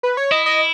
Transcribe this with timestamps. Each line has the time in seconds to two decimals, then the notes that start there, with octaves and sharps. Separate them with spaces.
0.03 B4
0.17 C#5
0.32 E4 D#5
0.46 D#5